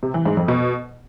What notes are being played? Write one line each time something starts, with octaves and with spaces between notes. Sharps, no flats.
C3
E3
G#2
F2
B2